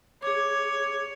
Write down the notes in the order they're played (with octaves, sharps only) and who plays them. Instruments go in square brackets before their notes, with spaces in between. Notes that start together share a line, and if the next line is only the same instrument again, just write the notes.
[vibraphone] G#4 D6 [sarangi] C#5